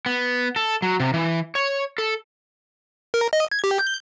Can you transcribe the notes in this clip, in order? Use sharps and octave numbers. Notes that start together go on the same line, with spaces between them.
B3
A4
F#3
C3
E3
C#5
A4
A#4
D#5
G#6
G4
G6